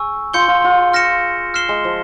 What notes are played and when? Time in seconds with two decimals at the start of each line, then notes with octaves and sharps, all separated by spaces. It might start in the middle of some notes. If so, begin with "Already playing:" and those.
Already playing: G#4 G#5 C#6 E6
0.34 F4 C6 G6 C#7 G7
0.48 F4
0.64 F4
0.93 F6 A#6 C#7 E7
1.54 F6 C7 E7 G7
1.69 G#3
1.85 F3